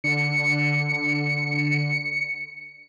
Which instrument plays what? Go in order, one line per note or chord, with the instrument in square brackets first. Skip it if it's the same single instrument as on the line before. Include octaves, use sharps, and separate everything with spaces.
[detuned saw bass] D3 [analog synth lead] C#7